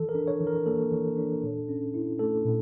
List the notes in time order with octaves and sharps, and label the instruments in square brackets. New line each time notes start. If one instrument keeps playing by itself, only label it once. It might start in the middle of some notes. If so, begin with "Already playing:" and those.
Already playing: [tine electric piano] E3 A4
A#4
D4
C#5
E3
A#4
A#3 A4
E3
D4
A#2
C#4
E4
A3 A4
A#2